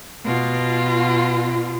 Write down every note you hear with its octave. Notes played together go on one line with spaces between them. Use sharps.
B2 F4